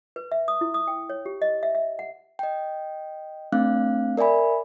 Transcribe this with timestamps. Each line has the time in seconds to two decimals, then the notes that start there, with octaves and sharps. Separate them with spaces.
0.16 B4
0.32 E5
0.48 D#6
0.61 E4
0.74 D#6
0.88 G5
1.10 C#5
1.26 G4
1.42 D#5
1.63 E5
1.75 E5
1.99 F#5
2.39 D#5 G5
3.52 A3 C4 D4 F5 F#6
4.17 A#4 D5 E5 G#5 B5